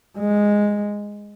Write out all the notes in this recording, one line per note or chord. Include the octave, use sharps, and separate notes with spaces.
G#3